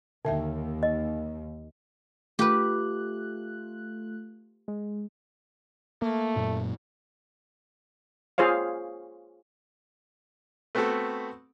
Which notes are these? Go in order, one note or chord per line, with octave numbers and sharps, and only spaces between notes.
D#2 D3 E5 G5
D#5
A3 F4 G4 B4 F#6
G#3
A3 A#3
F#2 A#2
F4 G#4 C5 C#5 F5
A3 B3 C4 F#4 A4